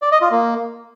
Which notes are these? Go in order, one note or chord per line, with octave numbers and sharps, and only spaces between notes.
D5
D#5
F4
A#3